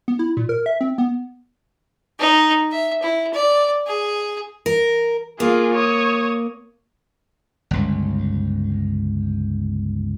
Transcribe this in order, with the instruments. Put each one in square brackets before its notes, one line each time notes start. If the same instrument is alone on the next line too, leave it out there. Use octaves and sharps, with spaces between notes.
[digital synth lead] B3
E4
A#2
A#4
E5
C4
B3
[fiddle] D#4
E5
E4
D5
G#4
[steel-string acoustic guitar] A#4
[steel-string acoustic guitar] A#3 [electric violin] F4 G#4
[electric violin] C#5 D#6
[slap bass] G1 C#2